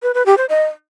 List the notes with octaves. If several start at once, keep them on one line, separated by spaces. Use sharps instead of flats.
B4
B4
G4
C5
D#5